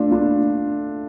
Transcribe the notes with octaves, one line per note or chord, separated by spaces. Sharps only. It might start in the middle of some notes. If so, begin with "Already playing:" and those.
Already playing: A3 D4 F4
D4 F4